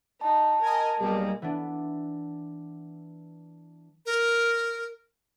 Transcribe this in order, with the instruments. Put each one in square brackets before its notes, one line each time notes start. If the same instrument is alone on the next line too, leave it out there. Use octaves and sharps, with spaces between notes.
[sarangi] D#4 [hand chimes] A5
[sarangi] A#4 [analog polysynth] D#5 G#5
[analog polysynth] B1 G3 A#3 [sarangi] G#3
[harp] E3 B3 D4
[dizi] A#4